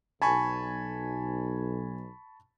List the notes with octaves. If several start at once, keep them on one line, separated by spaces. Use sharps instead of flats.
B1 G#5 A5 B5 C#6